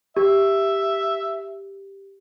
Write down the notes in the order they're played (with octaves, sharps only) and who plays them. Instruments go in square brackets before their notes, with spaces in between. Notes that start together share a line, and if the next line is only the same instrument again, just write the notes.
[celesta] G4 [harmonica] E5